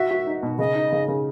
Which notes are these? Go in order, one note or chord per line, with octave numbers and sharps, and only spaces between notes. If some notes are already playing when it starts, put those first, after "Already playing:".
Already playing: F#4 E5
F#4
D#4
B2
C#3 D#5
D#4
C#3
C#3